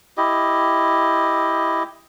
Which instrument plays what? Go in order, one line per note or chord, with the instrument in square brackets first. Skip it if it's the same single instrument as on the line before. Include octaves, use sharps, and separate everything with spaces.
[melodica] E4 G4 D#5